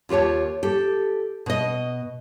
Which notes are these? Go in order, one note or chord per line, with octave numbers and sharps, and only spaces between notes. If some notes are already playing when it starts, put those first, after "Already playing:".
D#2 F4 G4 C#5 A5
G4 A4
B2 D#5